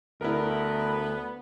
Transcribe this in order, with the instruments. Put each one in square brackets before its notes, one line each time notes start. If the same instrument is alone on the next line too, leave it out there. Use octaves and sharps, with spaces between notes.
[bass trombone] D2 [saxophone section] B3 [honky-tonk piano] E4 A#4